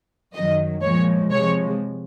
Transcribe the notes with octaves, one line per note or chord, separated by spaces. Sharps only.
F#2 D#3 F#3 D#5
A#2 F3 G#3 C#5
C3 F3 G#3 C#5